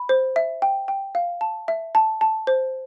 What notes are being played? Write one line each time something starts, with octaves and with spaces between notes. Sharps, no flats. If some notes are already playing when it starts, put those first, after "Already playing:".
Already playing: B5
C5
E5
G5
G5
F5
A5
E5
A5
A5
C5